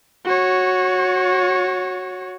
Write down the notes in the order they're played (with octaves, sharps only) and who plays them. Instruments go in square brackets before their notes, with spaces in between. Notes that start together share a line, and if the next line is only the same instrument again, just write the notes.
[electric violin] F#4 C#5